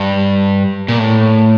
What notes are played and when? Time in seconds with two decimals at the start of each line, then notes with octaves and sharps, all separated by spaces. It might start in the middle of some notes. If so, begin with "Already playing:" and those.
Already playing: G2
0.88 A#2
0.99 A2